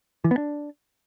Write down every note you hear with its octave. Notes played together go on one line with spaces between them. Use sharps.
E3
B3
D4